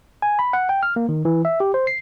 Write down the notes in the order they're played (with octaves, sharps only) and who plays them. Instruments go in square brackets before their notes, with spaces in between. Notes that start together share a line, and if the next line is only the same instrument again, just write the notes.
[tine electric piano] G#5
B5
F#5
G5
F6
A#3
D#3
E3
E5
G4
C5
C7